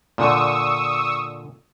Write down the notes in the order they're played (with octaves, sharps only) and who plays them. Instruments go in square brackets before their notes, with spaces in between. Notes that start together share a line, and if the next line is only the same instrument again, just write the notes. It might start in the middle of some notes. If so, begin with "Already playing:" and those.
[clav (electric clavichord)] A#2 D3 [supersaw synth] C#6 D#6 E6